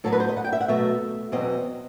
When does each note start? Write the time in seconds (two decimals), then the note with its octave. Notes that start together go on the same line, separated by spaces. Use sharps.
0.04 A2 F#3 B3 A4
0.13 B4
0.20 C5
0.29 D#5
0.37 F#5
0.44 G5
0.53 E5
0.60 F#5
0.68 B2 F#3 A3 E5
1.32 E2 B2 F#3 C4 D#5